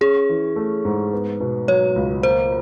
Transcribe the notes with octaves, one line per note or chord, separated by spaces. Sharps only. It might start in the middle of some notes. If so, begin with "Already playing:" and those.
C#4 G#4
E3
A3
G#2
B3
B2
F#3 C#5
C#2
A#3 C5